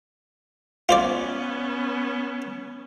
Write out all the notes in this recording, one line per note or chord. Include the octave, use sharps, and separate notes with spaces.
B3 C#4 F4 C5 D5